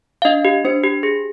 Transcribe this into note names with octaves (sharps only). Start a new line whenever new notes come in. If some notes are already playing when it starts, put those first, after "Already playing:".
F5
D4 D#5
G4
D4 C5
G4
G#4